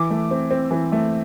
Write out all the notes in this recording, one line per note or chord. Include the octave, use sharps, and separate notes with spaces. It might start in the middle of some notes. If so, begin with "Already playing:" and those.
Already playing: E3 D6
A3
C4
C4
E3
A3